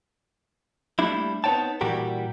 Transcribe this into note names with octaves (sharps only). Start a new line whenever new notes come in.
G3 A3 A#3 D4 E4
B3 C4 D#4 C#5 G5 A5
A#2 E3 G3 F#4 G4 A#4